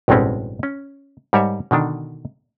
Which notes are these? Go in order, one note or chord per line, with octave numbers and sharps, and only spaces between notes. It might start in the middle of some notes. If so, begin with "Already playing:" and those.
A1 G2 B2 G#3 C4 C#4
C#4
G#2 G3 A#4 C#5 E5
B2 D3 D#3 D4